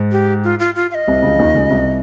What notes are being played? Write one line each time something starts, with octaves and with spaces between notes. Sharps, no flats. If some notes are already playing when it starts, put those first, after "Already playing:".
Already playing: G#2
G4
F4
F4
F4
F5
D#5
C2 C3
C#2 C#3
F3
D#2 D#3
C#2 C#3
C2 C3